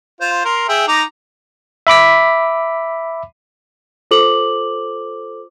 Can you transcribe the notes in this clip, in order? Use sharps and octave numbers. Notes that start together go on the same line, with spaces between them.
F4 C5
A#4 C6
G#4 E5 G5
D#4 A#5 D6
E5 B5 D6 B6
F4 A4 C5 D6 F#7